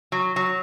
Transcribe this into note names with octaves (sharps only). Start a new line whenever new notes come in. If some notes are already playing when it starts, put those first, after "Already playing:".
F#3
F#3